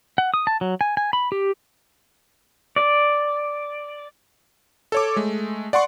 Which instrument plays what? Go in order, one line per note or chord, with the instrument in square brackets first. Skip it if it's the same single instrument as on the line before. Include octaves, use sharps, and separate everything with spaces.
[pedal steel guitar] F#5
D#6
A5
F#3
G#5
G#5
B5
G4
D5
[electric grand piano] A4 C#5 D6
G#3 A3
D5 F#5 C6 C#6